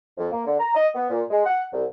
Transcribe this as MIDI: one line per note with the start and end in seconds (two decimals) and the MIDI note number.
0.18 0.30 41
0.31 0.44 58
0.45 0.59 50
0.59 0.71 82
0.75 0.87 75
0.95 1.06 59
1.09 1.22 46
1.30 1.42 56
1.44 1.63 78
1.72 1.84 36